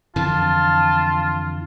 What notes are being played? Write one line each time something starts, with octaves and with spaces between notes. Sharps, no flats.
F2 D3 E3 F4 A5